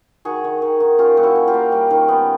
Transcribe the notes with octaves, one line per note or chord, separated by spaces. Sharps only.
D#3 F#4 G#4
D#3
D#3
D#3
C#4 F4 G4
A#2
E4 F#4
C#4
F4 G4
A#3
G3
D#3
B3